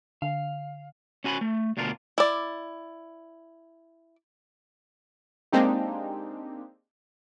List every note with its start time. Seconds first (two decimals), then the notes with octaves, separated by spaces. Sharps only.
0.22 D3 F5
1.24 C#4 F#4 G#5 A#5 B5
1.41 A3
1.77 D2 B2 D4 F4 A#4
2.18 E4 D5
5.52 G#3 A#3 C4 D4 D#4 G4